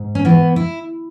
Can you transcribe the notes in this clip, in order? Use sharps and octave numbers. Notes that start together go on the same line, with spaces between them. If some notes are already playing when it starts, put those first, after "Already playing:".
Already playing: G#2
C#4
E3 B3
E4